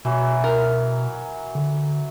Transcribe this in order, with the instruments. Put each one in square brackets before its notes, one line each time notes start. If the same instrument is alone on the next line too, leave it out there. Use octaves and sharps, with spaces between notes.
[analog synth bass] B2 [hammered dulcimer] E3 F#3
[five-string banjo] A#4
[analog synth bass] D3